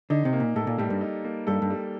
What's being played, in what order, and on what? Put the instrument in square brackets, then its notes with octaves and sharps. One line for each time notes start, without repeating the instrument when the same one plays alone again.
[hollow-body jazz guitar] D3 [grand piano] D#4
[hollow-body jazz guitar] C3
[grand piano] A#3
[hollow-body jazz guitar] A#2
[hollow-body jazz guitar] A2 [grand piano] A4
[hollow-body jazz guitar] A#2
[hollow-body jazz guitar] A2 [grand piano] G3
[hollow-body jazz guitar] G2
[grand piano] D#4
A#3
[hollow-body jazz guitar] G2 [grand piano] A4
[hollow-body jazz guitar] G2
[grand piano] G3